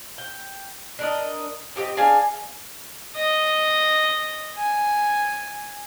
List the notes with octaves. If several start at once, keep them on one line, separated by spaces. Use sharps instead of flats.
G5
D4 A#4 D#5
C4 G4 G#4 D#5
D4 G#4 F5 G#5
D#5
G#5